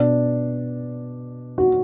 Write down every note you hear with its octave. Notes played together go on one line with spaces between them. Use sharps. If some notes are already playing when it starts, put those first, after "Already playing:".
Already playing: B2 D4
F#4